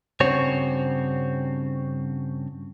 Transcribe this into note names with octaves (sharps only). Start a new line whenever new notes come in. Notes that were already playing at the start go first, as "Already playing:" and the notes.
G2 C#3 C4 F#4 C#5